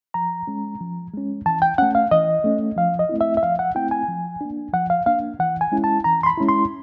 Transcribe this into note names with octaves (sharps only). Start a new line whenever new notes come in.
F3 A#5
G#3 C#4
F3
G#3 C#4
E3 A5
G5
A3 C#4 F#5
F5
E3 D#5
A3 C#4
F3 F5
D#5
A3 C4 E4
E5
E5
F3 F5
F#5
A3 C4 E4 G5
G#5
F3
A#3 D4
F3 F#5
F5
A#3 D4 F5
E3 F#5
G#5
G#3 C#4 E4
A5
E3 A#5
C6
B5
G#3 C#4 E4
C6